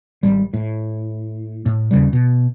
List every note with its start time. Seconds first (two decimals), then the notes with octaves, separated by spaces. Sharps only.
0.23 G#1 G3
0.54 A2
1.66 A2
1.91 D#2 C#3 G3
2.13 B2